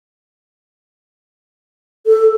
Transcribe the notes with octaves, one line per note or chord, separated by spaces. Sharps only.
A4